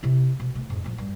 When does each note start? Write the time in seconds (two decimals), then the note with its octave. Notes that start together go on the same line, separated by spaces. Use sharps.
0.03 C3 E4
0.40 B2
0.55 A3
0.70 F2 G#2
0.84 A#2 F3
0.98 G2